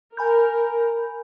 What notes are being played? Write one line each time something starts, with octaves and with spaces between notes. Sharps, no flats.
A#4 G#5 B5 G6